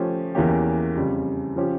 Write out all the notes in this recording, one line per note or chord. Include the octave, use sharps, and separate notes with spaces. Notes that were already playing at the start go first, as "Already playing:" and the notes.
Already playing: F3 A3 C#4 G4
E2 E3 A#3 C#4 G4
F2 C#3 G3
C#3 F3 C#4 G4